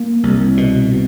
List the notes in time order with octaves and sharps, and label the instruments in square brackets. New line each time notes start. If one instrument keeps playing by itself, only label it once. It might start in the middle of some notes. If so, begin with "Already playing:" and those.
Already playing: [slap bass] A#3
C2
B2
B2